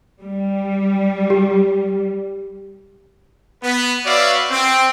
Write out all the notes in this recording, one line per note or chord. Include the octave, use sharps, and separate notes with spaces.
G3
G4
B3 B4
F#4 B4 C#5 D5 E5 F5
C4